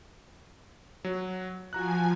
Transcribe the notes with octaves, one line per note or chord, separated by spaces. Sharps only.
F#3
F3 F#4 G#5 A#5 F#6